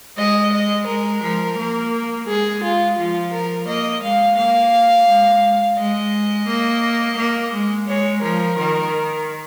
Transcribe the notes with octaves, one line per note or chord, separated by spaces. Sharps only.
G#3 D#5
D#5
G#3 A#4
F3
A#3
G#3 G#4
F4
F3 F4
A#4
A#3 D#5
G#3 F5
A#3 F5
G#3
G#3 D#5
A#3
A#3
G#3
G#3 C#5
F3 A#4
D#3